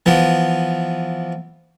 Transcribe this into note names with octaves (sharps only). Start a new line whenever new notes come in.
E3 F3 B3